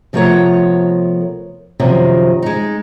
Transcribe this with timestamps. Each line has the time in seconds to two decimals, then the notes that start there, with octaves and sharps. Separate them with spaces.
0.13 C3 F3 A3 B3 A#4 C#5
1.80 F#2 C3 D#3 F3
2.42 G#3 D#4